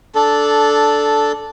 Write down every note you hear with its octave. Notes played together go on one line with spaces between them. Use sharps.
D4 A4